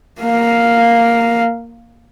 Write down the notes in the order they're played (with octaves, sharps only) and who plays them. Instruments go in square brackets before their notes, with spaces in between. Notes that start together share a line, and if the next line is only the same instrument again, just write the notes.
[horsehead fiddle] A#3 F5